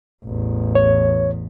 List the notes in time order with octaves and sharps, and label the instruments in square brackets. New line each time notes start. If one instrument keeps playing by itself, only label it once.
[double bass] A1 E2
[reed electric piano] C#5